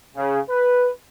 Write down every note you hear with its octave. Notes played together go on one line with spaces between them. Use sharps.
C#3
B4